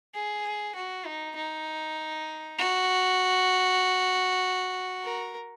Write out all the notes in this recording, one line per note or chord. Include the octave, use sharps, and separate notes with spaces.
G#4
F#4
D#4
D#4
F#4
A#4